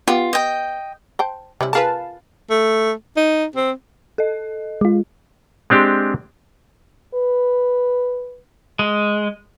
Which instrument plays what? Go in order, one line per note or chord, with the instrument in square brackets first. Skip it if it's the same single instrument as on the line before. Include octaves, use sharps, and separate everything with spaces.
[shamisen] B3 G4 [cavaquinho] F4
[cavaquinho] D#5 G5
[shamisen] C5 G5 A5
[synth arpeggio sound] C3 [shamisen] G3 C#4 E4
[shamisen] F4 G#4 A#4 [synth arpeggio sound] B4 F5 A5
[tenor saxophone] A3
D#4
C4
[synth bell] A4 D#5
[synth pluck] G#3 F4
[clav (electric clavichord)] G#3 C4 D4 G4
[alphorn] B4
[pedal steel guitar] G#3